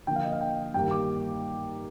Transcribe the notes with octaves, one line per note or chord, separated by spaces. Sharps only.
D3 F3 A#3 G5
F5
D#5
F5
G5
G2 D#3 G3 A#3 G5
D6